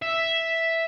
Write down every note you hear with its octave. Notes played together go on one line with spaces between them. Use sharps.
E5